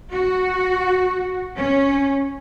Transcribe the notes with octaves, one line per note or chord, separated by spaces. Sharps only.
F#4
C#4